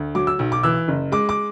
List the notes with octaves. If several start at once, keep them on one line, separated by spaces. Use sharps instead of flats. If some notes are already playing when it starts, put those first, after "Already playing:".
Already playing: D2
F#3 D6
E6
B1
D6
E3 E6
F#1
G#3 D6
D6